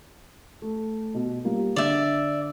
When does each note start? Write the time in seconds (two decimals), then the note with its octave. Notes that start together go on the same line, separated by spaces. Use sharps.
0.62 A3
1.14 B2
1.45 G3 A#3 F4
1.76 D3 D5 E5